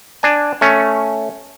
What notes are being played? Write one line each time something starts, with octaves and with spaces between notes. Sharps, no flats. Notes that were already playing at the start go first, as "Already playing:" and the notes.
D4 G#5
A3 C#4